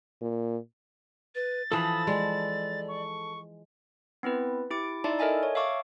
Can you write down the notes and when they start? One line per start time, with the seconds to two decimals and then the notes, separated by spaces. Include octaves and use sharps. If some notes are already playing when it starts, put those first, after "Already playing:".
0.21 A#2
1.35 B4 A6
1.72 E3 F3 A4 A5 B5 D#6
2.07 G#3 D5
2.88 C#6
4.23 B3 C4 E4 B4
4.71 E4 G4 D6 D7
5.04 D#4 E4 D5 E5 A5 C6
5.19 A4 A#4 D#5 E5 G#5 A5
5.43 C#5
5.55 E5 F5 A5 C#6 D6